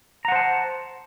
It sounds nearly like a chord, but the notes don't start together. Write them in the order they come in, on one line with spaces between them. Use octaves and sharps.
A#5 F#5 C5 A5